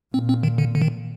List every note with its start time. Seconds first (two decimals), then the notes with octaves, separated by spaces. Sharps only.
0.14 A#2 C4
0.29 C4
0.43 D#3
0.58 D3
0.75 D3
0.82 D#3